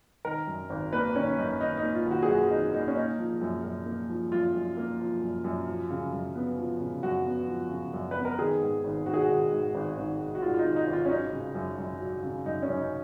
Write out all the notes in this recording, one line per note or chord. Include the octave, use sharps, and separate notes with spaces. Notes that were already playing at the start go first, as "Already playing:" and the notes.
D#3 A#4
F#2
G#1
A#3 B4
D#3 C#4
F#2 D#4
G#1 D#4
D#4
A#3
F4
D#3
F#4
G#4
F#2 F#4
G#1 D#4
A#3 D#4
C#4
A#3 D#4
F3
F#2
F#2
A#3
F3
F#2 F4
F#2
A#3
F3
F#2
F#2
F3
C#3
F#2
B3
F3
C#3
F#2 F#4
B3
F3
C#3
F#2
B4
B3
A#4
D#3 G#4
G#2
G#1
G#1 F#4
G#4
F#4
D#3
G#2
G#1
G#1
D#3
F#4
G#2 F4
F4
D#4
G#1
D#4
G#1
F4
C#4
F#3 D#4
C#3
F#2
F#2
F#3
C#3
F#2 D#4
C#4
F#2
D#4